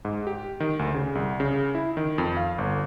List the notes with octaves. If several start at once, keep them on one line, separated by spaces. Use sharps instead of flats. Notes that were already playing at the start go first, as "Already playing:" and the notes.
G#2
G4
D#3
D2
C#3
C2
C#3
E4
D#3
F2
F5
G1